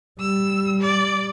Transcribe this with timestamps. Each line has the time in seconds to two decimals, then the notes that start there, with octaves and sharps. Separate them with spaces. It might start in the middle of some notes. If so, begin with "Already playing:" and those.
0.20 G3 E6
0.81 D5